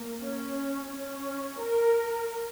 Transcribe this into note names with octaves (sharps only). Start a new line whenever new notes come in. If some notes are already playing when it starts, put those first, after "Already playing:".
Already playing: A#3
C#4
C#4
A#4